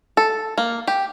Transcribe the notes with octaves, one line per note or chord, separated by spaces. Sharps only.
A4
A#3
G4